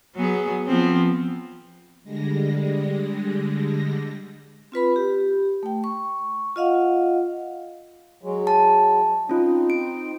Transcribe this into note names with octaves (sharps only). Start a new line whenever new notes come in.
F#3 B3 G#4
F3 B3 C4
D3 G3 G#3 A#6
C4 F4 B4 B5
G4
A3 G5
C#6
F4 D#5 F5 F#5
F#3 G#3
A5
C4 C#4 D#4 F4
D7